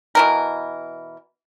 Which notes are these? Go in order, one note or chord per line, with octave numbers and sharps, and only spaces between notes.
B2 E3 A#4